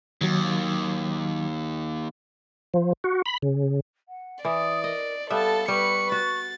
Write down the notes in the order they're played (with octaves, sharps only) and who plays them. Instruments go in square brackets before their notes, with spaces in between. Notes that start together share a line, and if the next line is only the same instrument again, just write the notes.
[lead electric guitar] D#2 [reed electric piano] D#3 F#3
[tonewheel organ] F3
F#4
B5
C#3
[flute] F#5
[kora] E3 [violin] D5 [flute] D#6
[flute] A#4 [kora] D#5
[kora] G3 B3 E5 [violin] A4 A5 [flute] F5
[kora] G3 [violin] B4 C#7 [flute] C#6
[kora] F#4 [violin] A6